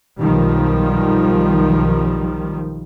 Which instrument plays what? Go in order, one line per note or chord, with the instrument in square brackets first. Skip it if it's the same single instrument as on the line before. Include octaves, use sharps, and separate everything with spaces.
[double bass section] B1 D#3 F3 G3